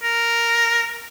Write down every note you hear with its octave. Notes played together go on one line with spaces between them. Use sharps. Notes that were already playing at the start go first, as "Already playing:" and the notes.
A#4